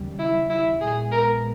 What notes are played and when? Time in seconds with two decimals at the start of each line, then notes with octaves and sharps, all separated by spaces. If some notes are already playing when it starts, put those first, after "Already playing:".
Already playing: D#2 C#3 G3
0.19 E4
0.50 E4
0.81 A#1 A#2 G#3 B3 G#4
1.12 A#4